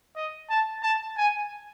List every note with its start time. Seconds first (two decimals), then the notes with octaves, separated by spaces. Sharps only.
0.16 D#5
0.50 A5
0.83 A5
1.17 G#5